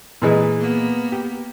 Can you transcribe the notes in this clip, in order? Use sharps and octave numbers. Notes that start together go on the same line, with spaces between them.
A#2 E3 G#3
A#3 B3
G4